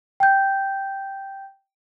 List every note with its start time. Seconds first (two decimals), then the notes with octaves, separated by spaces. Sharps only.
0.20 G5 G6